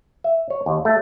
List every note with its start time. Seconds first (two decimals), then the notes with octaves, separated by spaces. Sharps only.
0.24 E5
0.50 C#5
0.66 D#2
0.85 A3